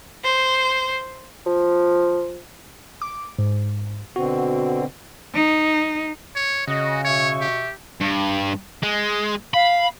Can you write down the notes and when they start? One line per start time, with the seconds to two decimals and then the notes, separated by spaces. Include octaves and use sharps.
0.23 C5
1.46 F3
3.02 D6
3.38 G#2
4.16 B2 D3 C4 F#4
5.35 D#4
6.36 C#5
6.68 C#3 F#4 D#5
7.05 B2 C#5 E5 C#6
7.41 G4
8.01 G2
8.83 G#3
9.54 F5 B5